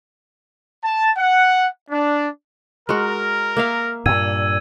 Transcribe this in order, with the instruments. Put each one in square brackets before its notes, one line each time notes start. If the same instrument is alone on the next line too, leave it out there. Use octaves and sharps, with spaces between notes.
[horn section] A5
F#5
D4
[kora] G#3 F#4 [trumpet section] A#4
[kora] A#3 E5 F5
[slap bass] G2 A#2 [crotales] E6 G#6 D#7